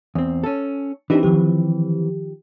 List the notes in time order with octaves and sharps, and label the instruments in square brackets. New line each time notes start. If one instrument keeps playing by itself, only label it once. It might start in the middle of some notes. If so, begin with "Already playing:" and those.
[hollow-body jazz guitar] E2 C4
C#4 A4
[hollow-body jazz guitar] E3 C4 [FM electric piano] D4 D#4 G4
[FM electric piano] D#3 F3 G4